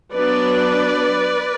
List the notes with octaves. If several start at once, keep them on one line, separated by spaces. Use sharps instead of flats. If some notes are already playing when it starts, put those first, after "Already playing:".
F#3 B3 D4 B4 D5